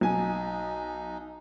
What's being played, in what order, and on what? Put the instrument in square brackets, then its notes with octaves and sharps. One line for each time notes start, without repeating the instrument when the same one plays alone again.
[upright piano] B1 G#5 [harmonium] D#4